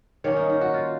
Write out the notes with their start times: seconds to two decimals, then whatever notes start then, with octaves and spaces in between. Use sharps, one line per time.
0.24 D#3 A#3 C#4 C#5
0.37 D#4
0.50 D#4
0.61 F#4
0.74 F4